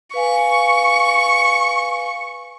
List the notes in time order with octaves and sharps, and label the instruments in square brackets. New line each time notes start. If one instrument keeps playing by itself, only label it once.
[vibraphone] B4 F5 G#5 [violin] C#6